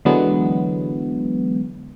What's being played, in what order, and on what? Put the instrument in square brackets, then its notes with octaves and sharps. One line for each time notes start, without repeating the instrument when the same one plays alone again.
[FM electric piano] D3 E3 F#3 G#3 B3